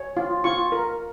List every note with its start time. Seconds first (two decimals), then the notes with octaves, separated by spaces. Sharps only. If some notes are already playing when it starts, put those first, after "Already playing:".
Already playing: C#5
0.17 F4
0.44 F4 C#6
0.72 A#4